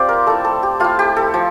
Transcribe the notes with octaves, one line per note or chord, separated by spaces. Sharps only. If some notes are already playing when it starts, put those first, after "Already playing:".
Already playing: C4 F4 G4 C5 D5
A#4
A3 E4 A4
A4
G4
A3 E4 F4
G4
A4
F3